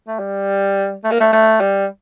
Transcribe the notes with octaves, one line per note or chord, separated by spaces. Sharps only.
A3
G3
A3
A#3
A3
A3
G3